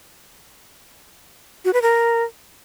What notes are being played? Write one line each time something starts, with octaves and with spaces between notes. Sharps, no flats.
F#4
B4
A#4